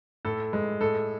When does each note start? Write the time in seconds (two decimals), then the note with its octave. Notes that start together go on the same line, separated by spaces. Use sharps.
0.25 A2 A4
0.53 G#3
0.81 A2 A4